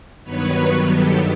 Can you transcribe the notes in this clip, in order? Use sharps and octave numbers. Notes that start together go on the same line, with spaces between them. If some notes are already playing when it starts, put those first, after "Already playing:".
G2 D#3 F#3 B3 B4 C#5
G4 A4